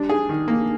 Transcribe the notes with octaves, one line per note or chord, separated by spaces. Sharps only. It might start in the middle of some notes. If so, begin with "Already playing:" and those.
Already playing: G3 D4
G#4
D#3
A#3